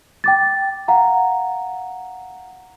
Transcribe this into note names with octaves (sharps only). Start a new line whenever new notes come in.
G5 D6 A6
F5 F#5 A#5